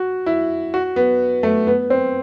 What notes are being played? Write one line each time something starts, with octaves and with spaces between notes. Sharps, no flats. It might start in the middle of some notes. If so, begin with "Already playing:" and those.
Already playing: F#4
E4
F#4
B3
A3
B3
C4